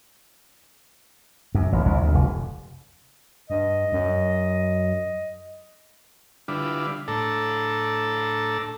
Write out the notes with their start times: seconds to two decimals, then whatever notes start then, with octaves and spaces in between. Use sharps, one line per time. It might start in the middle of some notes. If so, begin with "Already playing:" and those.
1.55 F#2
1.72 A1
1.86 C2
2.01 D2
2.14 F1
3.50 G2 D#5
3.92 F#2
6.48 D3 G3 D4 E4 F4 B4
7.08 A2 D4 A4 A5 A#5 E6